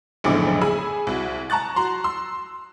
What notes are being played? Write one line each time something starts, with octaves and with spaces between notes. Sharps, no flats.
F#1 B1 F2 A2 D3 D6
G#4 G#5 B5 E6
C2 F#4
A5 A#5 C#6 F#6 A6
F#4 A#5 C6
C6 E6